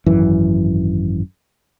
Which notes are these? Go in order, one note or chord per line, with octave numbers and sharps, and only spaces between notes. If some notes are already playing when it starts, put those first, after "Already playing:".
G#1 F#2 E3